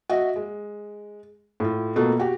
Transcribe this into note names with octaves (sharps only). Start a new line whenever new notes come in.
F#4 D#5 E5
G#3
A2 F4
B2 A3 A#3 F4
F#4 G4